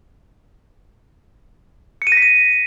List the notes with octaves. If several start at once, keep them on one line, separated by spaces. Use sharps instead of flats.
C#7
D#7
A#6
B6
D#7